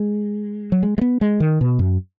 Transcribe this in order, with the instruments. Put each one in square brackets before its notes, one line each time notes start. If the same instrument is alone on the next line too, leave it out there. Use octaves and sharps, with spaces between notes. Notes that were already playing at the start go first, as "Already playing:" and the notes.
Already playing: [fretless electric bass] G#3
F#3
G#3
G#3
B3
G#3
D#3
B2
F#2